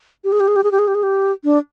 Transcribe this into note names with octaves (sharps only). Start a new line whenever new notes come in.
G4
G#4
G4
G#4
G4
G#4
G4
G#4
G4
G#4
G4
D4